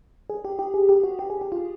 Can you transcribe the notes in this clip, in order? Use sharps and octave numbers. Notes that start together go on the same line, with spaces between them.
G#4
G4
G4
G#4
G4
F#4
G4
G#4
G4
F4